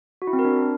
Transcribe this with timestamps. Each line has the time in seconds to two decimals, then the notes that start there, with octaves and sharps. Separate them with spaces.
0.22 F#4
0.27 E4
0.33 C4
0.39 A#4
0.45 D4